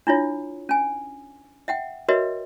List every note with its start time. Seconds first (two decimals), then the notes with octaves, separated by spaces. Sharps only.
0.07 D4 E4 F4 C#5
0.69 C#4 G#5
1.68 E5 F#5 G5
2.08 F#4 A#4 B4 C#5 D#5 E5